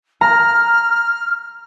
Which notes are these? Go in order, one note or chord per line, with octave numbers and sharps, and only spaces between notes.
A#5 F6